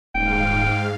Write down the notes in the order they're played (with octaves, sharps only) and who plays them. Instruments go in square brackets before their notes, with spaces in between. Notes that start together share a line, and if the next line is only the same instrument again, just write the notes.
[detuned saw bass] D#1 [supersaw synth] G#2 F5 [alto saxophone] G5